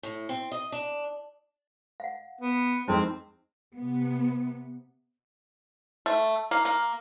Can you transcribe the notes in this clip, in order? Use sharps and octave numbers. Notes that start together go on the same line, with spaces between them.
A2
C4
D#5
D4
F5 F#5
B3
F2 G#3 C4 D4 D#4 C5
C3 B3
A3
A#3
A#3